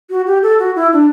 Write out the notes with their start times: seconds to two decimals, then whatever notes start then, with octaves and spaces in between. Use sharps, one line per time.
0.10 F#4
0.27 G4
0.43 A4
0.59 F#4
0.76 E4
0.93 D4